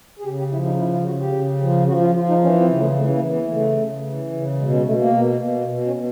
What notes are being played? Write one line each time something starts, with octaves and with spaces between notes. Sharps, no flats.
G#4
C#3 G4
G4
F3 E4
D#4
C#3 E4
F4
C#3 F#4
G4
C#3
F3
F3 F#4
F4
F3 F4
D#4
E3 C#4
C4
C#3
A3
E3 A3
A#3
E3
B3
C#3 A3
C#3
E3
C#3
B2 G#3
G#3
B2 A3
A#3
B2
B2
B2
C#4
B2